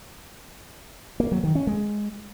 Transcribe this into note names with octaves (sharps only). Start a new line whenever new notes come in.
A#3
F#3
D#3
C#4
G#3